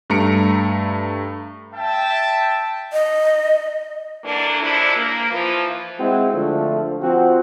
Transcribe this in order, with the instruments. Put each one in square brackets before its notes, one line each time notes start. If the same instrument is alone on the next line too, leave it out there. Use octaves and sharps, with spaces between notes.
[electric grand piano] G2 A3 A#5 C#7 D7
[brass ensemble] E5 G5 A5
[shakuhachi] D#5
[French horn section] D3 E3 F#3 A#3 D4
F#2 F3 G#3 D4 E4
A#3
E3 F3
[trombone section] G#3 C4 E4 F#4
D3 F3 A3
F3 C4 F#4